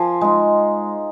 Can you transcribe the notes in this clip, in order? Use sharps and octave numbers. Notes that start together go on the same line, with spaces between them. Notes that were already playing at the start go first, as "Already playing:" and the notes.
Already playing: F3 G#5 C6
G#3 D#4